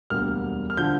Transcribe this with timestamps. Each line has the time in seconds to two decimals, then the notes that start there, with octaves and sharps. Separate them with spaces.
0.10 E1 D2 D3 G3 A#3 F6
0.70 F6
0.77 D3 F3 G6